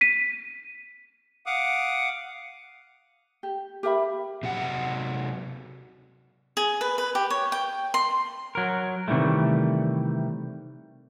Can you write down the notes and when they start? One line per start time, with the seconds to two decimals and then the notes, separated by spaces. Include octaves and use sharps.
0.01 B6 D#7
1.46 F5 F#5 D6 D#6
3.43 G4
3.83 G4 A#4 E5 B5
4.43 C3 F#3 F#5
6.57 G#4
6.81 B4
6.98 B4
7.15 G4
7.30 C#5
7.52 G5
7.94 C6
8.55 F#3 A#4
9.08 C3 D#3 E3 G3 A3